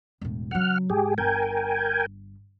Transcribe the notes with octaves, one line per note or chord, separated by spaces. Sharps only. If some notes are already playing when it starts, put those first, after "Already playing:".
E1 A2
C#3 F#3 F#5 F6
G#2 G4 G#4
G1 A#4 G5 G#5